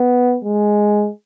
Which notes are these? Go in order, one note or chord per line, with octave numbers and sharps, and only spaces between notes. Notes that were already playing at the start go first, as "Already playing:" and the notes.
Already playing: B3
G#3